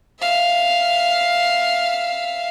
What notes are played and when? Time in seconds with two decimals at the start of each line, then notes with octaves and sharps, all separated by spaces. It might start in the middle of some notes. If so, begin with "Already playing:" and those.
0.20 E5 F5